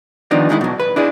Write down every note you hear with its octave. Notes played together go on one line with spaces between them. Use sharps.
D#3 F3 B3 D4 D#4
D2 D#3 G#3 D4 E4
B2 F#3
B4
D4 E4 G#4